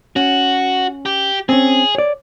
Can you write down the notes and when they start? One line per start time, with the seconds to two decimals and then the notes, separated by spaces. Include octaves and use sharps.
0.16 C#4 F#4
1.06 G4
1.49 C4 C#4 G#4
1.95 C#5 D5